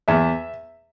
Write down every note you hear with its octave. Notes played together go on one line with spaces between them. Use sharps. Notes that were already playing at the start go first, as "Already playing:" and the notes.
E2 E5